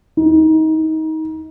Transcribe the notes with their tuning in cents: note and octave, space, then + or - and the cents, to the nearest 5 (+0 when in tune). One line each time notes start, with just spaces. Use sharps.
D#4 +25